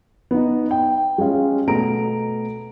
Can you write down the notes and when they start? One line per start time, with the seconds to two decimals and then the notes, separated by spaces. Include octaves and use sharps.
0.31 B3 D#4
0.71 G5
1.18 G#3 C#4 F4 F5
1.68 B2 A3 B3 A#5 D7